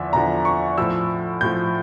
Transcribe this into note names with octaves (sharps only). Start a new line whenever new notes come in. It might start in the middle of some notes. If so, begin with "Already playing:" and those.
Already playing: E2 D3 F3 E5
E2 D3 F3 A#5
C#6
A2 F3 E6
A2 F3 G6